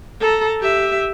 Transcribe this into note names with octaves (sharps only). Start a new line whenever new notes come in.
A4 A#5
G4 E5